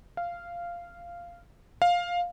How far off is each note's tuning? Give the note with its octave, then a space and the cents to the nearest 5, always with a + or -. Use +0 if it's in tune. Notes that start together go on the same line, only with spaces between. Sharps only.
F5 -10
F5 +10